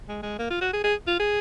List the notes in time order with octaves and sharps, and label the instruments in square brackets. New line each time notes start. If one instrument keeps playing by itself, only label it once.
[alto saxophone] G#3
G#3
A#3
F4
F#4
G#4
G#4
F4
G#4